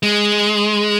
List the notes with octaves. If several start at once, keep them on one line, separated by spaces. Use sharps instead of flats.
G#3